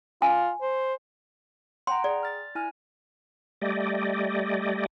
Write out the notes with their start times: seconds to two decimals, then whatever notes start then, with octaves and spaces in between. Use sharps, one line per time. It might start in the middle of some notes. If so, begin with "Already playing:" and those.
0.22 F4 G#5
0.61 C5
1.87 F#5 G5 A#5 C6
2.04 G#4 D5
2.23 F6 A6
2.55 E4 G#5 F6
3.62 G3 A3 G4 D5 D#5